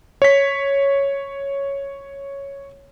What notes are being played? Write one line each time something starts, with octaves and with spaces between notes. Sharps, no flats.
C#5 B6